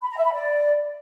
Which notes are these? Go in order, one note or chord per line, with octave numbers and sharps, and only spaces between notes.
B5
A#5
E5
B5
D5